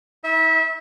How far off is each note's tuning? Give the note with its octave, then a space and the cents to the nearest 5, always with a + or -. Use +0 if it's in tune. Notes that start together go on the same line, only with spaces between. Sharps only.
E4 -45 E5 -25